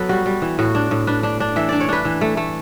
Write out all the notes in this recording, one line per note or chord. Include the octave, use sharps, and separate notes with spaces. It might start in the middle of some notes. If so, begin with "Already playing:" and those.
Already playing: F#3 B3 A4 B4
G3 F#4
G3
E3
A2 F#4
D4
A2
D4 B4
D4
D4
E3 E5
D4 D5
C#5
D4 B4
E3
A3
A3